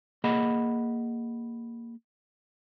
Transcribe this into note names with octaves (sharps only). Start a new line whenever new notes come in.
A#3 G#4 D#5 F#5 B5